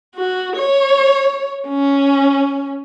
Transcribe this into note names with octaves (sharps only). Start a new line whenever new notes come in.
F#4
C#5
C#4